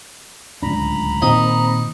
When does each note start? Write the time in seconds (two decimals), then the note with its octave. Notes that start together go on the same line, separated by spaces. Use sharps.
0.62 D1 C#2 D4 A#5 B5
1.22 A#2 D#3 C4 D#4